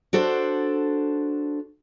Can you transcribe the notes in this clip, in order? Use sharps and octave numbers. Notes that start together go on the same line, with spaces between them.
D4 F#4 A4 C5